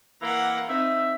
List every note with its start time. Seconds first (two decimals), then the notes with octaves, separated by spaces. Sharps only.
0.21 E3 A#3 F#5 A#5
0.67 C4 D#4 E5